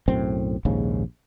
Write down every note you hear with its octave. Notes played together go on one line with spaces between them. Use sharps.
B1 F#2 A2 C4
A#1 D#2 G#2 C#3